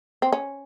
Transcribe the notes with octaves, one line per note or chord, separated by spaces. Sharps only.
C4
C#4